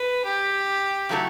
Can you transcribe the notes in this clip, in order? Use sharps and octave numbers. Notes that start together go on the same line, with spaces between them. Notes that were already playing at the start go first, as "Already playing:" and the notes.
Already playing: B4
G4
C#3 F#3 A3 E4 A4